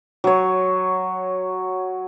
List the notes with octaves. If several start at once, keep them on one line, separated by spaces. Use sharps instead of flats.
F#3 C#5